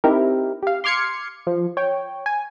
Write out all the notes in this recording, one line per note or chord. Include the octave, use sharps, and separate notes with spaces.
C4 D#4 E4 G4 A#4
G4 F5
C6 D6 F6 G#6 C7 C#7
F3
C#5 G5
G#5